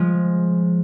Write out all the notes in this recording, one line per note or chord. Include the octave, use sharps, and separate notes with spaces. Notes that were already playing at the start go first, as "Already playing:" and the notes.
Already playing: F3 G#3